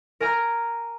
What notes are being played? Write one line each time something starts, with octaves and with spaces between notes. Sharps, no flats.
A#4 G#5 A#5 F6